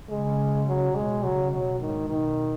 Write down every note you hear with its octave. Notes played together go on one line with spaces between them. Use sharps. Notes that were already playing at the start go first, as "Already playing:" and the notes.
C#3 G#3
F#3
B2 G#3
C#3 F#3
B2 F#3
G#2 D#3
B2 D#3